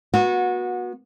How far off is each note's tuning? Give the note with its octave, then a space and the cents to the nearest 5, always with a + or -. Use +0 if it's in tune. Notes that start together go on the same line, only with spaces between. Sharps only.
B3 -30 F#4 -20